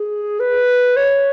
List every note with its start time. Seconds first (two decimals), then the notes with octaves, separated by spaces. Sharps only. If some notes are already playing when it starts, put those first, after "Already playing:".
Already playing: G#4
0.40 B4
0.97 C#5